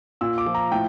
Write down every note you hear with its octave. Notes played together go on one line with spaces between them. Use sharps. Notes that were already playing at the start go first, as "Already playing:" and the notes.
A#2 E6
D6
F3
A#5
A2 G5